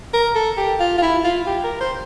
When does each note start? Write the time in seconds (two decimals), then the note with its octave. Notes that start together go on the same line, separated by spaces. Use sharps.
0.13 A#4
0.35 A4
0.57 G4
0.79 F4
0.98 F4
1.02 E4
1.24 F4
1.46 G4
1.64 A#4
1.80 C5